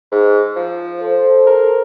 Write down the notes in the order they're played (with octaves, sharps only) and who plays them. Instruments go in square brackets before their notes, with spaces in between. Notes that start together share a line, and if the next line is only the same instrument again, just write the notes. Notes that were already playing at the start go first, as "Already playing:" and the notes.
[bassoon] G#2
F3
[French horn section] A4 C5
[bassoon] A#4